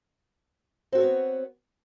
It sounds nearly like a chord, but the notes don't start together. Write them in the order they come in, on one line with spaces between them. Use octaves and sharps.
C4 F#4 A4 C#5 B3